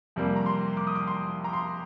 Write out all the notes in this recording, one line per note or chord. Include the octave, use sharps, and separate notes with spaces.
F2 C3 G3 A#3
A#5
C6
D6
D#6
D6
C6
A#5
C6